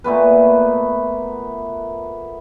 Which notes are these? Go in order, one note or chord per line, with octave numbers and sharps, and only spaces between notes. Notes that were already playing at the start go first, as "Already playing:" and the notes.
A#2 A3 B3 B4